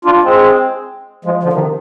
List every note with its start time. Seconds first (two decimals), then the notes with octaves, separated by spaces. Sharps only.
0.05 D4 F4
0.23 G#3 C4
1.25 F3 G#3
1.43 D3 F3
1.53 C3 D#3